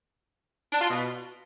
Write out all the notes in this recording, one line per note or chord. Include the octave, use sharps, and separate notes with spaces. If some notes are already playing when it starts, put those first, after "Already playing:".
D4
F4
B2